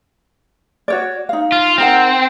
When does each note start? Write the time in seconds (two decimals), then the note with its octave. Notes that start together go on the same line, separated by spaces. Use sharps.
0.88 F#4 C#5 D5
1.29 D#4 F5
1.52 F4
1.78 C4 D#4 A#4 F#5